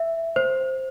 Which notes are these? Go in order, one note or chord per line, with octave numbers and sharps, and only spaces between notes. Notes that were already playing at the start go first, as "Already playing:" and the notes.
Already playing: E5
C5